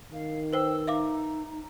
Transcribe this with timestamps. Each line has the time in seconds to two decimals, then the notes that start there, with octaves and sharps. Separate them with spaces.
0.12 D#3 F5
0.53 B4 C5 G5 E6
0.87 D#4 E5 F5 D6